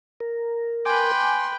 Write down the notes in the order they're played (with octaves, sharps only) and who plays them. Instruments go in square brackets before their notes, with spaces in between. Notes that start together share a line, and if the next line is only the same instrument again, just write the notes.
[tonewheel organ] A#4
[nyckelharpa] B4 G5 [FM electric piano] G#5 D6 [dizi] C6